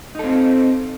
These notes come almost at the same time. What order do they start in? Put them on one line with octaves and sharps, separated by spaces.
D#4 A4 C4